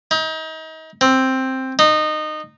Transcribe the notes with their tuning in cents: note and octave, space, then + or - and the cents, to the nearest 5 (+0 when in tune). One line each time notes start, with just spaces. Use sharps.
D#4 +35
C4 +5
D#4 -20